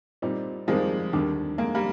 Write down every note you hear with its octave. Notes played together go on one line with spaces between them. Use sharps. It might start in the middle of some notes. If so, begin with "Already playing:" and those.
A#2 G3 C4 D#4
F2 D#3 F3 G3 G#3 A#3
D#2 D3 G3 D4
F2 D3 G#3 A#3 D#4
G3 A#3